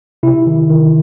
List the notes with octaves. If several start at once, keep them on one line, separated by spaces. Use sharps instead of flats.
C3 E4
D#3
D#3